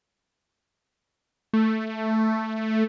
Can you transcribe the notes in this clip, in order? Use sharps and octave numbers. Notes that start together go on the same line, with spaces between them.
A3